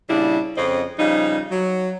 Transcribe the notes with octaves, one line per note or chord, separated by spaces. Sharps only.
A#2 C#3 G3 D4 E4
F2 C#3 C4 D#5
C#3 F3 G3 D#4
F#3